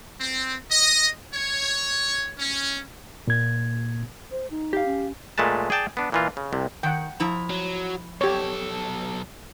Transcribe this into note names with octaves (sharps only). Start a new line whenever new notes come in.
C4
D#5
C#5
C#4
A#2 A#3 G#6
C5
D#4
G4 F5
C#4
A#2 G#3 A3 B4 A5
G#4 D5 G5 A5
B3 D4
A#2 E3 F4
C#3
C2 C3
D#3 F#5 G5
F3 E4 A#5
F#3
B1 G4 A4 C#5